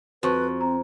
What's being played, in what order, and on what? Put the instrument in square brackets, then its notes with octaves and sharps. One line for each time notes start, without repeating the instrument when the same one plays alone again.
[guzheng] F2 [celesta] F#4 C5 C#6 [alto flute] B4
[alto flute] C4 [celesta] A#5